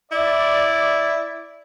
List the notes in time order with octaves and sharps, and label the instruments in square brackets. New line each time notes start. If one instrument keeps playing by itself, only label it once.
[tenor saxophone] E4 [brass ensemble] D5